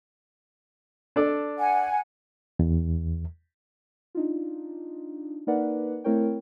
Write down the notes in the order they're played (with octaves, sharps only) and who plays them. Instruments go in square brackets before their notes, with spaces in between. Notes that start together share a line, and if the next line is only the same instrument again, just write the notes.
[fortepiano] D4 A4 D5
[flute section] F#5 G#5
[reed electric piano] E2
[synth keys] D4 D#4 F4
A#3 D#4 A#4 B4 D5 F#5
A3 C4 E4 A#4 C#5 G5